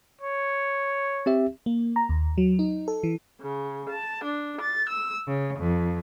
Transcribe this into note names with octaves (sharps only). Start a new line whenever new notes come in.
C#5
C4 G4 E5
A#3
A#5
D#2
F#3
D#4
A4
E3
C#3
A5
D4
A6
E6
C#3
F2